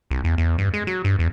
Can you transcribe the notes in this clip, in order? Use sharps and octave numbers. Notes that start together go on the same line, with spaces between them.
C2
E2
E2
G2
G#3
F#3
G2
E2